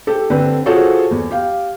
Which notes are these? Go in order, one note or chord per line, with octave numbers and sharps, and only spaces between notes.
G4 A4
D3 C4 B4
F4 F#4 G#4 A4 C5 C#5
E2
G4 F5